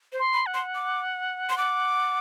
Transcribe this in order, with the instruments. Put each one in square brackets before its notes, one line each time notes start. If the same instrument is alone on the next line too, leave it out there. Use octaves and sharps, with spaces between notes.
[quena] C5
[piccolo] C6
[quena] B5
[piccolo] F#5
[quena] C6
D6
C6
D6